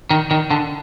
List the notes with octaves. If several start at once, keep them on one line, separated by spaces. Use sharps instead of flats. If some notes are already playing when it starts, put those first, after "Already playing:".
D#3
D#3
D3